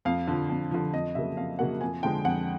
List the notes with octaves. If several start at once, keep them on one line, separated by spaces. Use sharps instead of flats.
F2 F5
D3 F3
F2
D3 F3
F2 D#5
C#3 F#3 A#3 E5
F2 F5
C#3 F#3 A#3 F#5
F2 G#5
D3 F3 G#3 G5
F2 F#5